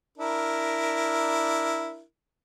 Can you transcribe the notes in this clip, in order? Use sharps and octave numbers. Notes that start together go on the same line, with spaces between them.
D4 E4 A#4